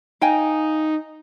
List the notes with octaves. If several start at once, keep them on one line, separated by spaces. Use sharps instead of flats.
D#4 F5 G5 G#5